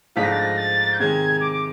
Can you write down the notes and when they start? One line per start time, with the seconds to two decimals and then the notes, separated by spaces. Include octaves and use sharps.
0.16 G#2 F3 A3 D4 F4 B6
0.23 A#6
0.32 A6
0.39 A#6
0.58 A6
0.93 G6
0.99 C3 D#3 G#3 G#6
1.41 D6
1.52 D6